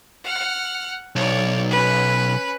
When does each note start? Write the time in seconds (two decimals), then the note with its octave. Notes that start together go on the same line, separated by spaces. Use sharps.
0.24 F#5 F6
1.16 B1 C#5 D5
1.71 C#4 B4